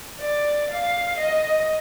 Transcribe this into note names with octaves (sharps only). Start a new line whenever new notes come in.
D5
F5
D#5